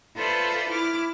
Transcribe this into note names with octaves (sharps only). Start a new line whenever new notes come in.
F4 A4 B4 C5 D5 E5
E4 D6 F6